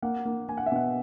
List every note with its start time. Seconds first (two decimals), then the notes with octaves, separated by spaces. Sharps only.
0.02 A#3 F#5
0.25 A#3
0.49 A#3 G#5
0.57 F#5
0.66 E5
0.72 B2 F#5